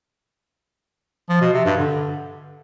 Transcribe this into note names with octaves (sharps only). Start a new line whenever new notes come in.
F3
B2
C3
G2
D3